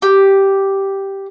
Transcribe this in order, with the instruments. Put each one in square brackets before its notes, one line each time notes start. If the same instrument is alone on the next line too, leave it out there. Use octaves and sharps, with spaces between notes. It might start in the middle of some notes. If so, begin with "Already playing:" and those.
[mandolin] G4